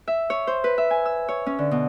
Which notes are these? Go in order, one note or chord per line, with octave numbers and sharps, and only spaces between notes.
E5
C#5
C5
B4
E5
G#5
E6
C#5
C#4
D3
B2